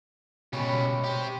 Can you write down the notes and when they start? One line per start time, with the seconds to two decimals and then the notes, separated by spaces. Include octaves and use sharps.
0.53 C#2 B2 G3 C#5 B5 C#6
1.04 G4 C5